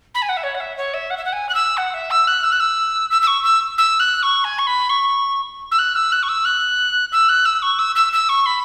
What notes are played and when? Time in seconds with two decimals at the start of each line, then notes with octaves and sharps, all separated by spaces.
0.14 B5
0.22 G#5
0.29 F#5
0.37 E5
0.43 C#5
0.54 F#5
0.60 E5
0.77 C#5
0.94 E5
1.10 F#5
1.17 E5
1.25 F#5
1.32 G#5
1.49 F#6
1.54 E6
1.77 F#5
1.94 E5
2.10 E6
2.27 F#6
2.43 E6
2.52 F#6
2.60 E6
3.11 E6
3.22 E6
3.27 C#6
3.44 E6
3.78 E6
3.99 F#6
4.22 C#6
4.44 G#5
4.58 C#6
4.67 B5
4.89 C#6
5.71 E6
5.78 F#6
5.95 E6
6.12 F#6
6.23 C#6
6.29 E6
6.45 F#6
7.12 E6
7.28 F#6
7.45 E6
7.62 C#6
7.79 E6
7.95 E6
8.13 E6
8.29 C#6
8.46 B5